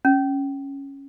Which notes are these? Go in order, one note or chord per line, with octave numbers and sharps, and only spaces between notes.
C#4